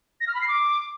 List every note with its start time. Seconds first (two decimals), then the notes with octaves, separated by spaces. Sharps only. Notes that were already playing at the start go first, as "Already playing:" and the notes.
0.21 A#6
0.27 F6
0.34 B5
0.41 C7
0.48 D6